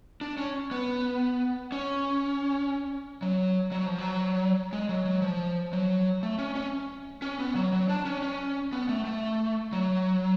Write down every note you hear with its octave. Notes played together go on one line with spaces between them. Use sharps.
D4
C#4
B3
C#4
F#3
F#3
F3
F#3
G#3
F#3
F#3
F3
F#3
A3
C#4
C#4
C#4
B3
F#3
F#3
D4
C#4
C#4
B3
A3
A3
F#3